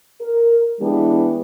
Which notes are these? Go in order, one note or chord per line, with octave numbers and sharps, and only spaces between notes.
A#4
E3 G#3 B3 D4 G4